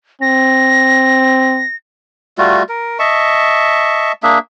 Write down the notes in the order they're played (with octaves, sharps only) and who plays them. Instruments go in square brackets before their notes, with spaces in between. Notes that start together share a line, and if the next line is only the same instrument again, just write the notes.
[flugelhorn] C4 [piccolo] A#6
[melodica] G3 A3 F4 F#4
A#4
D#5 E5 A5 C#6
A#3 D4 G#4 E5